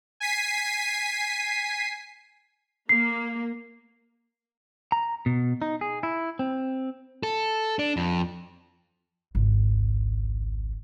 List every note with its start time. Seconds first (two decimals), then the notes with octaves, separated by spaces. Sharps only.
0.20 G#5 B6 C7 D#7
2.89 A#3 C7
4.92 A#5
5.26 B2
5.62 D#4
5.81 G#4
6.03 E4
6.39 C4
7.23 A4
7.79 D4
7.97 F2
9.35 G#1 C#2